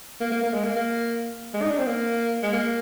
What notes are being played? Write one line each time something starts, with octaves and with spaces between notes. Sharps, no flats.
A#3
A#3
A#3
G#3
A#3
A#3
G#3
D#4
D4
C4
A#3
G#3
A#3